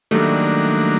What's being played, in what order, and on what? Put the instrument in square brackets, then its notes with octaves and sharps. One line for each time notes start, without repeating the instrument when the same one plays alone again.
[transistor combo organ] D#3 F#3 A#3 D4 [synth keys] G3 A3